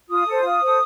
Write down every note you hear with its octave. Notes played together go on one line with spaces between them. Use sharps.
F4 D#6
A4 C5
F4
A4 C5